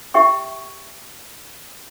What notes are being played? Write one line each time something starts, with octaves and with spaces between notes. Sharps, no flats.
G4 E5 G5 C#6